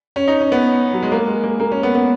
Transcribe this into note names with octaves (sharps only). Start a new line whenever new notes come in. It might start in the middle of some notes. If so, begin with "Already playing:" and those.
C#4
D#4
C#4
B3
F#3
G#3
A#3
G#3
A#3
A#3
C#4
B3
B3